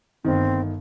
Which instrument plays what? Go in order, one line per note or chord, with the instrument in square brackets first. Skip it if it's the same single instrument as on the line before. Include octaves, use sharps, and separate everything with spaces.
[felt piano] G1 D#3 [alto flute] C4